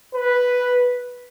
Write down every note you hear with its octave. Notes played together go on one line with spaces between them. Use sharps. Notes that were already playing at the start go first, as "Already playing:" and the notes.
B4